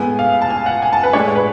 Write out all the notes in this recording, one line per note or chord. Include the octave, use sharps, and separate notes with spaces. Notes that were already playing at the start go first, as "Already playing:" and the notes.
Already playing: A2 G#3 B3 G#5
F5
A5
G#5
F#5
G#5
A5
B4
A2 G#3 D4 C#5
B4